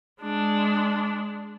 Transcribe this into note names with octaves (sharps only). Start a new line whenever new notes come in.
G#3 D4